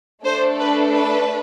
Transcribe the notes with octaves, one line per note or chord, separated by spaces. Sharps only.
A3 D4 A4 C5
B4
B4